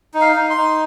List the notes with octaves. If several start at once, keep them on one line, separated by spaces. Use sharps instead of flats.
D#4
F5
D#4
C6
D#4